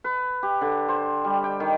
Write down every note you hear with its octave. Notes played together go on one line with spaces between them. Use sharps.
B4
G4
D3
C5
G3
G5
D#3